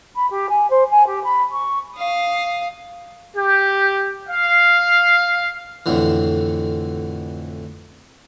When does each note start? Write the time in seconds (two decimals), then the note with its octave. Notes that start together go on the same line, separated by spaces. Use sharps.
0.16 B5
0.31 G4
0.50 G#5
0.70 C5
0.91 G#5
1.07 G4
1.24 B5
1.52 C#6
1.97 F5 D#6
3.35 G4
4.28 F5
5.86 F2 A2 D3 E3